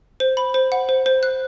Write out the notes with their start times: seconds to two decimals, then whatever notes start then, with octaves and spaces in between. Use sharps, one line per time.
0.20 C5
0.37 B5
0.54 C5
0.72 F#5
0.89 C5
1.06 C5
1.23 F#6